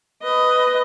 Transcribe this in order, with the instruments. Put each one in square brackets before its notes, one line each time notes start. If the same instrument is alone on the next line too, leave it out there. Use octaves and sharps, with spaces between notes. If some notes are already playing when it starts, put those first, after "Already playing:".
[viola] B4 D#5